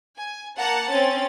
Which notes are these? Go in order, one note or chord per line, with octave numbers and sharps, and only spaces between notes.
G#5
A#3 F#5 A5 A#5
C4 C#4 A6